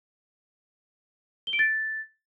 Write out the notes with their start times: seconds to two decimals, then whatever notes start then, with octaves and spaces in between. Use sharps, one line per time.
1.47 G7
1.53 D7
1.59 A6